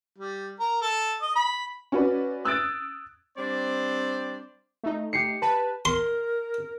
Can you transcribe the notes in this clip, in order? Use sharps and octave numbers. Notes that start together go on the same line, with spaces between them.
G3
A#4
A4
D#5
B5
C#4 F#4 B4 D5
D#6 E6 F#6 G#6 A6 D7
G3 C4 D4 C5 D5
A3 D#4
G4 C7 C#7
B4 A5
A#4 C6